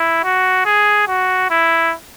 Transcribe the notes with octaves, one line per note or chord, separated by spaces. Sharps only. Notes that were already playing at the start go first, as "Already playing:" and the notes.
Already playing: E4
F#4
G#4
F#4
E4